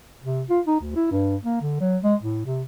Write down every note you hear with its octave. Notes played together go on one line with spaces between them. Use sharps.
C3
F4
D#4
D2
E4
G2
A#3
D3
F#3
G#3
A2
C3